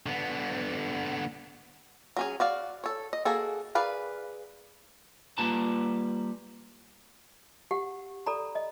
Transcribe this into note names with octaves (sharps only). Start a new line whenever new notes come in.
D3 B3
F#3 C#4 G#4
F#4 D5 F5
A4 C#5
D#5
A#3 F#4 G#4 A4
G#4 A#4 B4 D5 F5
G3 A#3 F4 B4 A5 A#5
G4 F#5
A4 D5 A#5 B5
D#5